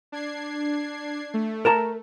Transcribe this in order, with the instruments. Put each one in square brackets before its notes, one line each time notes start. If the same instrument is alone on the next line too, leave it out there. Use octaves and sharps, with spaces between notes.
[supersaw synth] D4 G#6 C7
A3
[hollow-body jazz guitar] A#4 A5 A#5